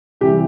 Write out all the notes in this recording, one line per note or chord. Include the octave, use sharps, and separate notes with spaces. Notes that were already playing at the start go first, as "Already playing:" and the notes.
C3 E3 G3 G4